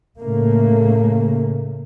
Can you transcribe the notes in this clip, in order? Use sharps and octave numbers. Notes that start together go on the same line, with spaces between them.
A2 C#3 A3 A#3